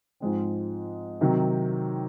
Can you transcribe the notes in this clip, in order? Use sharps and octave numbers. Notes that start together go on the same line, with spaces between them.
G#2 F3 G#3 C4
C3 D#3 F#3